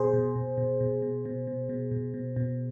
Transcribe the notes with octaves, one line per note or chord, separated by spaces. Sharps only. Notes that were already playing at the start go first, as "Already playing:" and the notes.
Already playing: B2 G#4 C5
B2
B2
B2
B2
B2
B2
B2
B2
B2
B2
B2